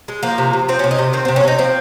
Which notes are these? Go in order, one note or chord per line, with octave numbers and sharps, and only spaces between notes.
G#3
F3 A#3
C3
C3
F3 C4
C#4
C3
D#4
C3
D#3 C4
C4
C3
C#4
C3 D#4
F3 C4